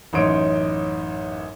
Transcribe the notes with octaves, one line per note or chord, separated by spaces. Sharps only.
A1 F#2 D#4 C#5 C6 D7